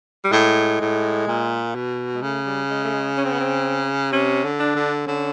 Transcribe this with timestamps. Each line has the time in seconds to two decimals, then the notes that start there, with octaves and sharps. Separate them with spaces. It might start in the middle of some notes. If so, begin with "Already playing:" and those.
0.24 G3
0.32 A2 G#3
0.81 A2
1.27 A#2
1.75 B2
2.14 G#3
2.22 C#3 A3
2.46 G3
2.70 G#3
2.84 A3
2.93 G#3
3.18 C#4
3.25 C4
3.33 B3
3.41 C4
4.12 C3 C#4
4.44 D3
4.60 D4
4.75 D3
5.07 D3 C#4